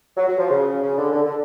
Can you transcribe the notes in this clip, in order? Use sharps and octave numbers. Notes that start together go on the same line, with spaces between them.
F#3
F#3
F3
C#3
C#3
D3
D3
D3